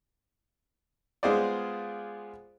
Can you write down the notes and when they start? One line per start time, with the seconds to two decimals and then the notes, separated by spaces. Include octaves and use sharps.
1.23 G#3 B3 F4 G#4 C5 D5